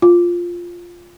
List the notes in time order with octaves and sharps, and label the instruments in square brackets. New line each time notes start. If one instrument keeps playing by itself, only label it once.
[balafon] F4